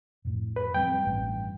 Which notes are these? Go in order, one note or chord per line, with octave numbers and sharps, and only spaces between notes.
F2 A2
B4
F3 G3 C4 G5
A1 G2